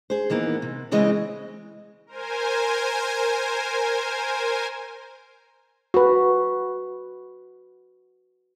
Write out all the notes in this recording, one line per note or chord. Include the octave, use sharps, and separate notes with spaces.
G#4 C5
D#3 E3 A#3 B3
C3
C#3 E3 G#3 C4 D#5
A#4 C5 G#5
F#4 B4